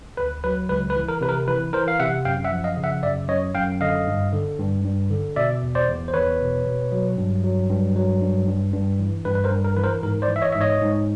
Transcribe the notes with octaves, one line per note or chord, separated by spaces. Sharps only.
D2 B4
F#3 B4
C#2 B4
B4
E3
A#4
C3 B4
A#4
E3 B4
E3 A#4 C5
F5
C3 E5 F#5
F#2 F5 G5
E5 F#5
F3
D#5 F5
C#3
E5 F#5
F#2 D5 E5
F#2 C#5 D#5
F#2 F5 G5
D3 D#5 F5
G2
D3
G2
G2
D3
B2 D5 E5
E2
C5 D5
E2
C5
E2 B4 C#5
B2
B2
F#3
G2
F#3
G2
F#3
G2
G2
G2
E3
G2 B4
B4
A#4 C5
G2
A#4
E3 B4
A#4 C5
G#2 A#4
C5 D5
E3
E5
C#5 D#5
G#2 E5
C#5 D#5
G#2